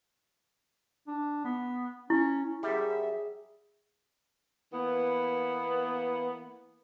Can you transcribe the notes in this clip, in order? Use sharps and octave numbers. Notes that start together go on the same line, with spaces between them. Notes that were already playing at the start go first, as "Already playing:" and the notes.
D4
B3
C#4 E4
F#2 G3 G#4 E5
E3 A#3 B3